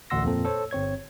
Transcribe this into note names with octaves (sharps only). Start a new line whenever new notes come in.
A1 D2 F#5 C6 E6 A#6
F2 A#2 A#3 C4 A4
A4 C5 C#5
G1 C4 C#5 G#6